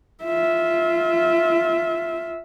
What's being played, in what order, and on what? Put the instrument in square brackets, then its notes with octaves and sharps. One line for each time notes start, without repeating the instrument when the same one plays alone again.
[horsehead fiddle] F4 E5